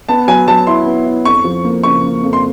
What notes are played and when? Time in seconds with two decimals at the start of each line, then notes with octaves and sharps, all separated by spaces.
0.09 B3 A5
0.28 F#3 G#5
0.47 F#3 A5
0.67 E4 C6
0.86 B3
1.06 E4
1.25 F2 C#6
1.44 F3
1.64 A#3
1.83 C#3 C#6
2.03 A#3
2.23 F2
2.33 C6